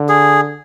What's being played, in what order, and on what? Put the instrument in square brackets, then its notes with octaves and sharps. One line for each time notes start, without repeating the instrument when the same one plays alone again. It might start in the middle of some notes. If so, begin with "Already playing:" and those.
Already playing: [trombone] D3
[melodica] G#4